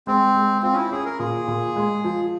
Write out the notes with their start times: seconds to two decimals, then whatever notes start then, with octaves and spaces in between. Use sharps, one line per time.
0.07 G#3 C4
0.35 G#3
0.63 C4 F4
0.73 C#4
0.77 E4
0.91 C#4 G#4
1.05 A#4
1.19 A#2 G#4
1.48 A#2
1.76 G#3
2.04 F3